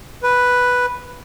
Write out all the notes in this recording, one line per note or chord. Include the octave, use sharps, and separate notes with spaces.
B4